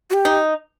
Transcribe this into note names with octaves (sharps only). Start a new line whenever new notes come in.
F#4
G4
D#4